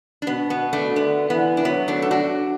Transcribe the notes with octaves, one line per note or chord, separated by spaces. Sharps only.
D4
B2 B3
B3
A3 D4
D3 B3
E3 B3
D4
F#3 B3
A3 D4
A4
D4 F#4